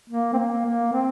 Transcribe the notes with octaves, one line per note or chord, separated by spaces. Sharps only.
A#3
C4
A#3
A#3
C4